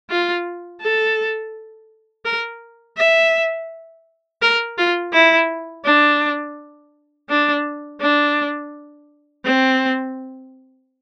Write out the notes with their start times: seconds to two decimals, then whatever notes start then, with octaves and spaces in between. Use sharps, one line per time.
0.10 F4
0.82 A4
2.25 A#4
2.97 E5
4.42 A#4
4.78 F4
5.13 E4
5.85 D4
7.29 D4
8.01 D4
9.45 C4